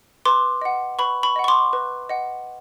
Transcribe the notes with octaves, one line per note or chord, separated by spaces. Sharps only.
B4 C6 D6
D#5 F#5
B4 B5 C#6
B5 C#6
D#5 F#5
C#6
C6 D6
B4
D#5 F#5